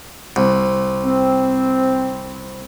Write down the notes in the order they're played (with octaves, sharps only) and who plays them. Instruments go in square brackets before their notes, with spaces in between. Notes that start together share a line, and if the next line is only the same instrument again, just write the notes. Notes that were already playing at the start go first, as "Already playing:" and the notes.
[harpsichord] C2
[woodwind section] C4